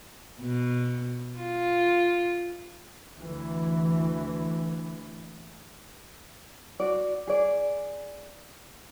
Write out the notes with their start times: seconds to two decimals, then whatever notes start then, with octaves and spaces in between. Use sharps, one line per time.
0.40 B2
1.39 F4
3.16 D2 E3
6.80 F#4 D5
7.27 G#4 D5